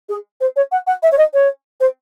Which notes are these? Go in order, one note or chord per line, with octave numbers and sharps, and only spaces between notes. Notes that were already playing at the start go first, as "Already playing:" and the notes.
G#4
C5
C#5
F#5
F#5
E5
C#5
D#5
C#5
C5